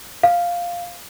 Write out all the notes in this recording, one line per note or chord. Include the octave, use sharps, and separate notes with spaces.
F5